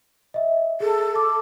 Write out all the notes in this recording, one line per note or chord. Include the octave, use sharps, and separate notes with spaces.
D#5 E5
G#4 A4
D6